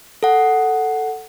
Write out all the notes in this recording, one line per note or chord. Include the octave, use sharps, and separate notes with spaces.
A4 F#5